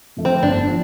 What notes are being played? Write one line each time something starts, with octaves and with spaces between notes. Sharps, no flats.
F2 D3 A3
C4
G1 D4
F3